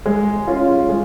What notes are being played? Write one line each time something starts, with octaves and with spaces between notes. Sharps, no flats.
G#3
C#4 F4
G#3